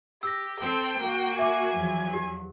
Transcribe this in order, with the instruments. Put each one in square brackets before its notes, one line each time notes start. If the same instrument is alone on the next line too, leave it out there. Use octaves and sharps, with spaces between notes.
[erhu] G4 [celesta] E6 A#6
[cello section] C4 A4 [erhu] G5
[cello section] A#3 F#4
[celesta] E5 D6 [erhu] G#5
[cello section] E2 F3 F#3
[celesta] G4